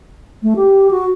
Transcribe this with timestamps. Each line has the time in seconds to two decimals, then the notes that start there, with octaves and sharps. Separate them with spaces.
0.43 A3
0.56 G4
0.91 F#4